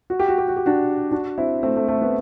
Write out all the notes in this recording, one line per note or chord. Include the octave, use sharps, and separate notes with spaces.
F#4
G4
F#4
G4
F#4
G4
D4 F#4
D4 F#4
C4 E4
A3 C4
A3
A3
B3